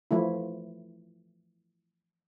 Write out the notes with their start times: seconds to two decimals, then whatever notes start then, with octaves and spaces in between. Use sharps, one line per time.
0.11 E3 F3 A3 E4